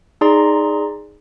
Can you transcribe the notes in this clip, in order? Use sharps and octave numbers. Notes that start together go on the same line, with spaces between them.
D#4 G#4 D5 A#5 C6